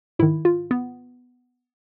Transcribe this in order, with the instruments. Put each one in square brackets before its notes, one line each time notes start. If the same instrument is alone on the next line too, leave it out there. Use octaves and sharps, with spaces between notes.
[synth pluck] G#2 D#3 E4
F4
B3